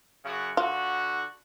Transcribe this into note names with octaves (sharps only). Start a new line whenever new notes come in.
F#2 C#3 F#4
D3 F4 F#4